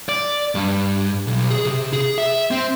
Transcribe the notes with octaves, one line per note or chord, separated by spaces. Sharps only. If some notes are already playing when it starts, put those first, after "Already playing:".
D5
G2
B1
G#4
C3
G#4
E5
C4